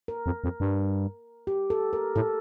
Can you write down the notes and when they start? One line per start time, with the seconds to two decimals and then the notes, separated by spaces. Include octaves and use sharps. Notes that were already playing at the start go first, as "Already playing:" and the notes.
0.08 A#4
0.26 F2
0.44 F2
0.60 G2
1.47 G4
1.70 A4
1.93 A#4
2.16 A2 A4